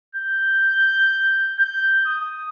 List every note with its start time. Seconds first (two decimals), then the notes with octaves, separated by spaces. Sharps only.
0.15 G6
1.59 G6
2.06 D#6